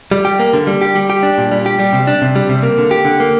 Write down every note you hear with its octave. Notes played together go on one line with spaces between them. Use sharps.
G3
G4
A#3
D3
G3
G4
G3
G4
D4
A#2
G3
G4
G3
C3
D4
C3
G3
C3
A#3
D3
G4
D3
A#3